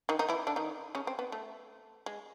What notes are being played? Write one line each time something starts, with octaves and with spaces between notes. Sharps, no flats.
D#3 D#4
D#3 D#4
E3 E4
D3 D4
D#3 D#4
C#3 C#4
C4
B3
A3
G#3